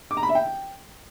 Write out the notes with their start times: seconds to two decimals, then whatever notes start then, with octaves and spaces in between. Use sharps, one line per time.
0.11 D6
0.17 A#5
0.23 B5
0.29 E5
0.35 G5